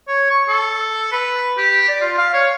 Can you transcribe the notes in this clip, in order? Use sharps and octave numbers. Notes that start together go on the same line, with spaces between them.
C#5
C#6
A4
B4
G4
D5
F4
F5
C#5